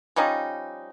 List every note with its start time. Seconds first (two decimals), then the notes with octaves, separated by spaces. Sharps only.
0.16 F3 G3 C#4 D#4